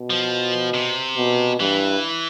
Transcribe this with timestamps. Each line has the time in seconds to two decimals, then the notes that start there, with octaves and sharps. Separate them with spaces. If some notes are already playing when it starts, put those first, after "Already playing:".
Already playing: B2
0.10 F3
0.74 C3
1.17 B2
1.60 G2 E3